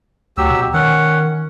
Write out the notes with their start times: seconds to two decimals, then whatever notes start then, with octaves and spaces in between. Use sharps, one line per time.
0.37 D2 F#3 G4 E6
0.51 B2
0.74 D#3 C#4 F#5